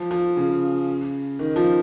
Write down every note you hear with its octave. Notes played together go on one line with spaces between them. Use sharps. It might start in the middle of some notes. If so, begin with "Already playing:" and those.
Already playing: F3
F3
C#3
D#3
F3